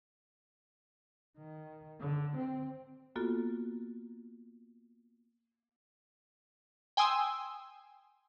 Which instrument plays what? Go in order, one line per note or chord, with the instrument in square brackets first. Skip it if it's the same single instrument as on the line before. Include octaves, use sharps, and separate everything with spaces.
[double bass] D#3
D3
C4
[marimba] A#3 B3 F4 F#4 A4
[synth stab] G5 G#5 C6 D#6 E6